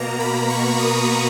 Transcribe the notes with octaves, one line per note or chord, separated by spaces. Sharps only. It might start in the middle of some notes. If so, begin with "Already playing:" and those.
Already playing: B2 A#3 A#5
B5
C#6
D#6